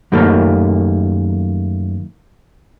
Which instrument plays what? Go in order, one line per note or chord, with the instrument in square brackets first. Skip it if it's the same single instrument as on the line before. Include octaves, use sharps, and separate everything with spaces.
[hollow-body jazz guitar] F#2 D#3 G3 A3 A#3